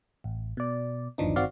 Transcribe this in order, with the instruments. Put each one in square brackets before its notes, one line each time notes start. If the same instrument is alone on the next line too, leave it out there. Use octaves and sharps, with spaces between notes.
[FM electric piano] A1
B2 D5
G1 D#2 E3 F3 D4 D#4
G1 D#3 C4 F#4 D5 F5